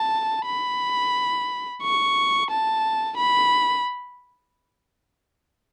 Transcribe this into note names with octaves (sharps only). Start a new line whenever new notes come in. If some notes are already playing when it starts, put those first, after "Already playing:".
Already playing: A5
B5
C#6
A5
B5